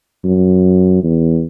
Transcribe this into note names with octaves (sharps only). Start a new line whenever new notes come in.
F#2
E2